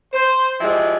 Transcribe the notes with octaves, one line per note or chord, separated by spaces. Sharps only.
C5
F3 G#3 E4 G4 D5